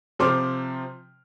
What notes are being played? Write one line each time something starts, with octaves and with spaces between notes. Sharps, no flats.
C3 F3 C5 C6 D6 F6